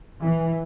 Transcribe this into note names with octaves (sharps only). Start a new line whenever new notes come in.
E3